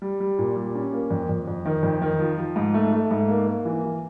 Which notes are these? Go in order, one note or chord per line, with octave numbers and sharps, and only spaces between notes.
G3
G3
A#2
G3
C#4
A#3
F2
F2
F2
D#3
F2
D#3
F3
F3
G#2
A3
A3
G#2
A#3
A#3
E3
E3